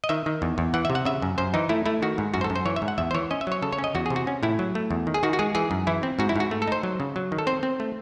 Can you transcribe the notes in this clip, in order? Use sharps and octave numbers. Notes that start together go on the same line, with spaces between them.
D#5
D#3 E5
D#3
E2
E2
E3 F#5
E5
C3
F#5
C#3 E5
F#2
F#2 C5
E3 D#4
A3 E4
A3 E4
D#3 F#4
G#2
F#2 F#4
C5
A4
F#2
C5
E3 C#5
E5
G#2
F#5
E2 E5
C5
E3 C#5
C#4 D#5
E5
F#3 C#5
C#3 A4
C#5
C#4
D#5
E2 F#4
G#4
C3
F#4
C#4
A2 E4
F#3
A3
E2
D#3
G#4
D#3 F#4
F#4
G#3 G#4
E3 G#4
F#2
E3 E4
C4
G#2 F#4
E4
G#2 F#4
A3
A4
D#4 C5
F#3
C#3
F#3
D#3
A4
C4 C5
C4
A3